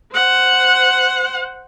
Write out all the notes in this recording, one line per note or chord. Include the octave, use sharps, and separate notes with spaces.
C5 F#5